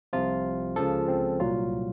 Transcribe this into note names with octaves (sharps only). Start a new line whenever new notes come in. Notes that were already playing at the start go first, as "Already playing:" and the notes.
C2 C3 F3 F4
C#2 C#3 F3 A4
C4
C2 A#2 F#3 F4